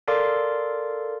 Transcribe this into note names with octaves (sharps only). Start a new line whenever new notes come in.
A4 A#4 D5 F5 C6 D6